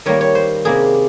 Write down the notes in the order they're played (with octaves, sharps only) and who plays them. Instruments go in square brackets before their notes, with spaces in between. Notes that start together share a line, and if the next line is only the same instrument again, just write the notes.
[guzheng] D#3 G3 A#3 C#5
C#5
C5
C3 G3 A#3 G#4